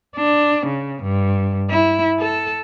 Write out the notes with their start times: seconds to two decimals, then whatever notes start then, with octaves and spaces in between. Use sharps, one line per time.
0.16 D4
0.66 C#3
1.03 G2
1.70 E4
2.20 A4